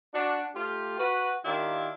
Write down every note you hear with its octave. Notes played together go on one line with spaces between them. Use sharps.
D4 F#4
A3 F4 G4
F#4 B4
D#3 A#3 D4 E4 F4 G4